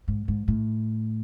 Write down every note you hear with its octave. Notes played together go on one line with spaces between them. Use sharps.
G#2
G#2
A2